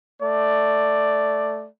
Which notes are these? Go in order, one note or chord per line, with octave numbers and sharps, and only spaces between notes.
A3 D5